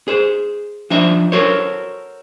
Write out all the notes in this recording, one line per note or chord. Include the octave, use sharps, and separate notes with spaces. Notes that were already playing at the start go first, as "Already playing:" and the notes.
G#4 C5
F3 D4 D#4 C5 E5
F#4 A4 A#4 C5 C#5